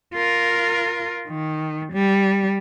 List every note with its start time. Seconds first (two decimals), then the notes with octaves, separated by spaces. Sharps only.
0.15 F4 A#4
1.28 D#3
1.94 G3